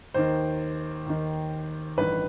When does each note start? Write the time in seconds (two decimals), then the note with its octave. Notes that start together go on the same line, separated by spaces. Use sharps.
0.14 D#2 D#3 C5
1.06 D#2 D#3
1.98 A1 G2 D#3 B4